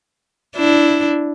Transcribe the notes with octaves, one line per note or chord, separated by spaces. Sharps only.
D4 E4